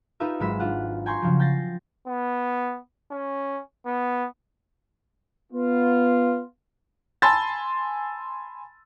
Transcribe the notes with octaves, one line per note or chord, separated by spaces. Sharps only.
D#4 F4 G4 B4 E5 A#5
G#1 F#3 G#3 B5 E6 B6
D4 F4 F#5
G5 G#5 A#5 C6 C#6 G6
C#3 F3 F#3
G5 G6 A6 A#6 C7
B3
C#4
B3
B3 F4
G#5 A5 B5 C6 E6 A6